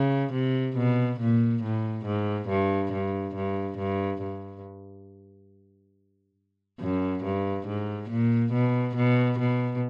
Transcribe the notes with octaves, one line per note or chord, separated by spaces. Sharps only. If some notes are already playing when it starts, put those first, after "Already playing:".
Already playing: C#3
C3
B2
A#2
A2
G#2
G2
G2
G2
G2
G2
F#2
G2
G#2
A#2
B2
B2
B2